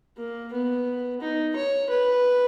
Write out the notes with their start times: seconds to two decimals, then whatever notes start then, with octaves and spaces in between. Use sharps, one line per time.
0.17 A#3
0.53 B3
1.21 D#4
1.56 C#5
1.90 B4